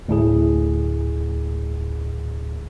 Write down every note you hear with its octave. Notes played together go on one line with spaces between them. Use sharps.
D2 A2 G#4